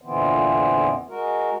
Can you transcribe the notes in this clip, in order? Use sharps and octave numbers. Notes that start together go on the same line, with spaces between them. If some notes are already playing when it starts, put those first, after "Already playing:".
F2 A#2 D3 E3 B3 C4
G#3 F#4 A#4